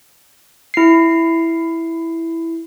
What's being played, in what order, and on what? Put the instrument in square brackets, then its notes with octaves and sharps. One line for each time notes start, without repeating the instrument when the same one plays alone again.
[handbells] E4 C7